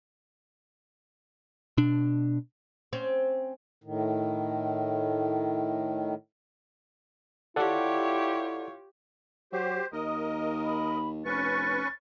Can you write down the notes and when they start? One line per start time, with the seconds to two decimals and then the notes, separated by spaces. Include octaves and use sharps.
1.78 B2 D4
2.93 C4 C#4
3.84 A2 D#3
7.56 E4 F4 G4 A4 C#5 D5 F#5
9.53 F#3 G4 C5
9.93 D#2 A#4 D#5 D#6
10.64 B5
11.25 F1 C#4 B4 C#6 A6